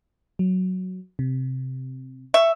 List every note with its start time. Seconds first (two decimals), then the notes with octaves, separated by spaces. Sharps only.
0.39 F#3
1.19 C3
2.34 E5 C#6